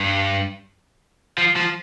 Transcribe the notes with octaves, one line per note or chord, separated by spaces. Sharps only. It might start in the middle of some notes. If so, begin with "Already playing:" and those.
Already playing: G2
F3
F3